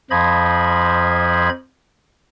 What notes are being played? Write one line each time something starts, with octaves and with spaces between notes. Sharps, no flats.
F2 F3 C5 D#5 B5 G#6